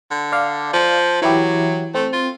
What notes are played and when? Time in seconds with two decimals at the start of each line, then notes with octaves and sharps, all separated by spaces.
0.11 D3
0.32 D5 F5
0.73 F3
1.22 E3 F#3 E4 G4
1.94 A3 C4
2.13 F4